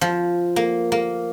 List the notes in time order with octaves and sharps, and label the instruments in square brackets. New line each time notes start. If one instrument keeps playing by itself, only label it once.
[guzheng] F3
A#3
A#3